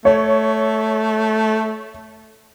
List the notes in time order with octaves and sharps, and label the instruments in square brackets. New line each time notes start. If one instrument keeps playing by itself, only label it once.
[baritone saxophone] A3 [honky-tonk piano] C#5